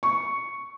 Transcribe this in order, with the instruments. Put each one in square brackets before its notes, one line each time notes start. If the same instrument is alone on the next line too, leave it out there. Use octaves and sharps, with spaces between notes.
[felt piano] C#6